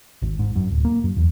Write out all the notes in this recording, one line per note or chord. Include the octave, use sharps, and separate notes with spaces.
G#1
G#2
F#2
D1
A#3
F#2
E2